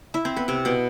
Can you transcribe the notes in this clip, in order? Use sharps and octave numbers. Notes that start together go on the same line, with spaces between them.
E4 E5
C4 C5
B3 B4
C3 C4
B2 B3